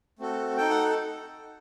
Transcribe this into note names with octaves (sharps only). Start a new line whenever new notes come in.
A3 C4 F#4 A4
D#4 A4 G5
F#5